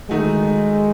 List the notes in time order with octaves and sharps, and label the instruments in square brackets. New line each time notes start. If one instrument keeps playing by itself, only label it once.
[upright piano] D#3 A3 D#4 F#4 [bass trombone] G#3